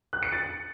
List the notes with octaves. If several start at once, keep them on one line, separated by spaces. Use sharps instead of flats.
F#6
C#7
A6